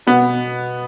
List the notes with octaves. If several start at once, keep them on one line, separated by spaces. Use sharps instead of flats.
B2 B3